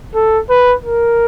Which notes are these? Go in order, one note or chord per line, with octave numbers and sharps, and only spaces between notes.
A4
B4
A#4